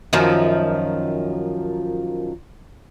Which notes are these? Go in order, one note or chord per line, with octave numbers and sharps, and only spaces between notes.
F#2 D#3 F3